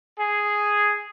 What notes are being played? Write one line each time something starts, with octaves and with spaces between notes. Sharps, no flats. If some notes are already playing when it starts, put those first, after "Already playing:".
G#4